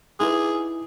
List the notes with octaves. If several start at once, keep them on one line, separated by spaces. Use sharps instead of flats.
D#4 E4 G#4 B4